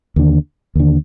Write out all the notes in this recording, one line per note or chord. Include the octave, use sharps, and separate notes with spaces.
D#2 D3
D#2 D3